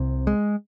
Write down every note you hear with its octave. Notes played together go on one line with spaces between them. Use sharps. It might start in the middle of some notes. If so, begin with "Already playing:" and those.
Already playing: C2 C3
G#3